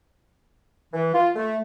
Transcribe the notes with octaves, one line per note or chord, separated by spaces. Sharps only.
E3
F4
A3